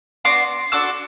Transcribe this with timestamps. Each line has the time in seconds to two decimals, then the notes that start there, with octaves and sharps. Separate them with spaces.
0.25 B3 D4 F#4 C6 D6
0.72 D4 F#4 A4 D6 E6